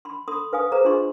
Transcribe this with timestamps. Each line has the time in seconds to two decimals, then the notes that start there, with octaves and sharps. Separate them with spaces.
0.05 B5 C6
0.28 A4 B5 C6 D#6
0.53 B4 F5 G#5 D#6
0.72 G#4 B4 C5 F5 A#5
0.85 D4 F4 G#4 D#5 C6 C#6